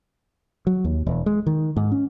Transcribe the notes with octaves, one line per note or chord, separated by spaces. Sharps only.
F#3
D#2
E1
G#3
D#3
G#2
C#4